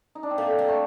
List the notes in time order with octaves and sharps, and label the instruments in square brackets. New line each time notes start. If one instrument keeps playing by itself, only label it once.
[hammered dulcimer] D#4
D4
C4
[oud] A3 [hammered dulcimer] A#3
[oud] G3
[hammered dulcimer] A3